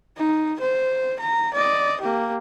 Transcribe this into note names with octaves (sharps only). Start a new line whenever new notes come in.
D#4
C5
A#5
D5 D#5
A#3 G4